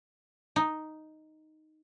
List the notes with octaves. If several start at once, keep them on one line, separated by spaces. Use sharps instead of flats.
D#4